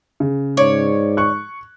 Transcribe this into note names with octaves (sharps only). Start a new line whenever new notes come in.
C#3
G#2 C#5 D5
C#6 F#6